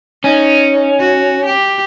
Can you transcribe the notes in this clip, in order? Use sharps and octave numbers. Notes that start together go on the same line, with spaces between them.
C#4 D#4
F#4
G4